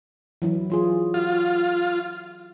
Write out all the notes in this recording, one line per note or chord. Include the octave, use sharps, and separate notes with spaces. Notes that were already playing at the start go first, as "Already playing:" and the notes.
E3 F#3 E4
F#3 F4 G#4
F4 F#4